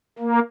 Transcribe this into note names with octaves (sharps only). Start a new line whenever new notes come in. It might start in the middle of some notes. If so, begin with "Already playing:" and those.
A#3